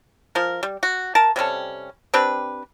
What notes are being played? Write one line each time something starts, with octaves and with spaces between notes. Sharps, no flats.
F3 A#4
G3
F#4
A#4 A5
C3 G3 C#4 A4
C4 D4 G4 B4